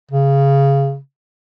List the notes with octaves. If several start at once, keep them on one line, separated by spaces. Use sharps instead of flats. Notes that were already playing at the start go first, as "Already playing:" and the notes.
C#3